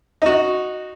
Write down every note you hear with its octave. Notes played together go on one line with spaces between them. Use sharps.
D#4 F#4